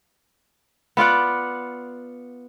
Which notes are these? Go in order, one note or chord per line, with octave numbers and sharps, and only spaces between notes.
B3 F4 D5 F#5